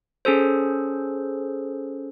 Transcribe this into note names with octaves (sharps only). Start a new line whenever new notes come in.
C#4 G#4 A4 C5